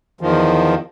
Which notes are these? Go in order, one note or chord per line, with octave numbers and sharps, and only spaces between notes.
E2 D#3 F3